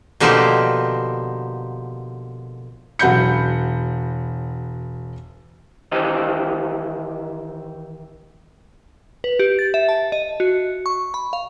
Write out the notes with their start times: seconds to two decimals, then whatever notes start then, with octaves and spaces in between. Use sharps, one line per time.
0.20 B2 D3 F3 A#3 D#4 G4
2.99 E1 F#3 F#5 B5 G6 C#7
5.92 D#3 E3 G4 C5 D#5
9.24 B4
9.39 G4
9.59 A6
9.74 E5
9.89 A5
10.12 D#5
10.40 F#4
10.86 C#6
11.14 B5
11.33 F5